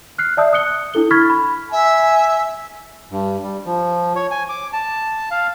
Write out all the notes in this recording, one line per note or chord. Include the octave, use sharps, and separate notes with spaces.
F6 F#6 C7
D5 E5 A5 D#6 E6 G6
D#6 F#6 C#7 G7
D4 E4 A4 G7
B5 C#6 F6 G#6 A6 B6
B5
E5 G#5
G2
G3
F3
C#5
G#5
D6
A5
F5